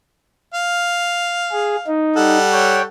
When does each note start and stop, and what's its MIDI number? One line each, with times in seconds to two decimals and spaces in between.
0.54 1.95 77
1.52 1.76 68
1.87 2.38 63
2.16 2.85 55
2.16 2.85 69
2.16 2.85 78
2.53 2.82 73
2.53 2.82 79